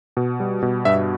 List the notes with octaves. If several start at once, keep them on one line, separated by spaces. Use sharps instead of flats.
B2
G3
B2
G2 E5